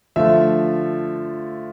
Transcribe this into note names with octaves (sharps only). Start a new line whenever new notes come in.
D3 F3 A3 E5